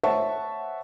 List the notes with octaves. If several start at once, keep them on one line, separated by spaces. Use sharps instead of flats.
C5 C#5 E5 F#5 A5 C#6